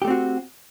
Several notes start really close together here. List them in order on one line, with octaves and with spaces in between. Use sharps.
G4 A3 C4 F#4